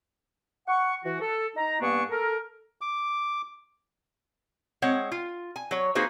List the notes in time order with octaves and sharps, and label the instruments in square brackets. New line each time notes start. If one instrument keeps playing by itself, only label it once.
[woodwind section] F#5 C#6
E3 F#4
A4
D#4 A#5
G2 A#3 B3 D4 G#5 C#6
A4 A#4
[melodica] D6
[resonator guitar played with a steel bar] G#3 C4 C#5 F#5
F4
G#5
F#3 C#5
A#3 D#4 F#4 G#4 B4 C5